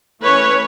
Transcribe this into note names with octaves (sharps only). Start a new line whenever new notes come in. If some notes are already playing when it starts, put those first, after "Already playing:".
E3 A3 C#4 B4 C#5